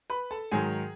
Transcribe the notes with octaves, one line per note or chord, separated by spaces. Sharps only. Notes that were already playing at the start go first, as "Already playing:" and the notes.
B4 B5
A4 A5
G#2 D#3 F#3 G#4 G#5